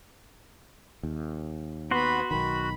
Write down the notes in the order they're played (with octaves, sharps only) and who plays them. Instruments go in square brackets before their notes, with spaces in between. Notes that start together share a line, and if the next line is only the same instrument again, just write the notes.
[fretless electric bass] D#2
[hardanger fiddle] B3 B5 [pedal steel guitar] F#4 C6
[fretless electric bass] B1 D#3 [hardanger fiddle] B5